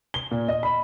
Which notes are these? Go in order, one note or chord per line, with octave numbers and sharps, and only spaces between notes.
G7
A#2
D#5
B5